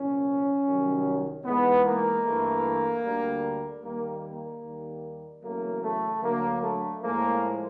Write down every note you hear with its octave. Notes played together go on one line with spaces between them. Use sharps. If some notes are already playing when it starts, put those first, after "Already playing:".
Already playing: C2 A#2 F3 C#4
C2 C3 D#3 F#3
G#2 E3 G#3 B3
A#3
G2 E3 A3
D2 D3 G3
D#2 D#3 G3 A#3
A#3
D#2 D#3 G3
E2 C#3 F#3 A3 A#3
A3
D2 D3 F#3 A#3
A3
A2 F3 G#3 A#3